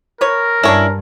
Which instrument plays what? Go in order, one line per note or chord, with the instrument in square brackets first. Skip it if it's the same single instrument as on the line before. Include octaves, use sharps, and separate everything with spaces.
[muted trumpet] A#4 [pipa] B4 C#5
[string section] G2 [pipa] C#4 D4 [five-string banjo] E4 C#5